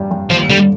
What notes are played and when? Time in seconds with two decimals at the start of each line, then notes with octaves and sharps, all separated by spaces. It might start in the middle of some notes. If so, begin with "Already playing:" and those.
Already playing: G2 G3
0.11 G2
0.30 D#2 F3
0.49 D3 G3